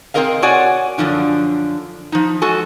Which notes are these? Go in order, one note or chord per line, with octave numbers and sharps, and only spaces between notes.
C3 C4 G#4 A#4 D#5 F5
F#4 C#5 D5 F#5 G#5
F#2 A#2 D3 F3 D4
F3 D#4
G#3 F#4 A4 G#5